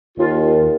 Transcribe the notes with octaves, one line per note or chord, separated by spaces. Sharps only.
D#2 F4